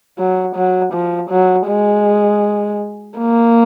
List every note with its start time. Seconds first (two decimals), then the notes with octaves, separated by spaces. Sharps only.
0.18 F#3
0.55 F#3
0.93 F3
1.30 F#3
1.68 G#3
3.18 A#3